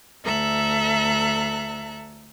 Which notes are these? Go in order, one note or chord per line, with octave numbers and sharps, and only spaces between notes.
D2 A4 E5 A#5 F#6